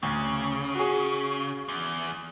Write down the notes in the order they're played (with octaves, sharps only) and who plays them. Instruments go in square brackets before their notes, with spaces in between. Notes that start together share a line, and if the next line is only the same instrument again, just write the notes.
[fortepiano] D2 [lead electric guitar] C#3
[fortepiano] F#4 G#4
[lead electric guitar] E2